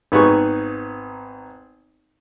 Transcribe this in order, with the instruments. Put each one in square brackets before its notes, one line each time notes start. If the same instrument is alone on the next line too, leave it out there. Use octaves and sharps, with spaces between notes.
[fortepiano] G#1 B3 D#4 G#4 C#6